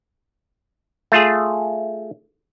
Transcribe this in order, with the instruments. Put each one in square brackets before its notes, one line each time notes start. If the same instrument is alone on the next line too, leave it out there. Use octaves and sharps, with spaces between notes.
[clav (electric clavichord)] A3 F4 G#4